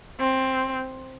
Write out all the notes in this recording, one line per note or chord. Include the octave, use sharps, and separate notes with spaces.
C4